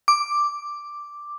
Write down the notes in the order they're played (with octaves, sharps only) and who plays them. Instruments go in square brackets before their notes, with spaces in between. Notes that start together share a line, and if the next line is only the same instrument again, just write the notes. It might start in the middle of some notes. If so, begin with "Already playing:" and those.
[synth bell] D6